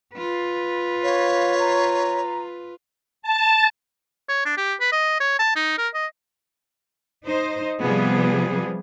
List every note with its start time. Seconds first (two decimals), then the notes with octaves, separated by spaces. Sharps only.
0.14 F4 B4
1.03 C#5 F5
1.59 A#5
3.22 A5
4.29 C#5
4.46 D4
4.57 G4
4.80 B4
4.92 D#5
5.20 C#5
5.39 A5
5.56 D#4
5.78 A#4
5.94 D#5
7.25 D#4 C5 D#5
7.82 C3 F3 G3 B3 G#4